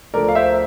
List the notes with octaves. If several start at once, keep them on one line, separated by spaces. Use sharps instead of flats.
D2 D3 F3 A3 A#4 D5
F5
C5 E5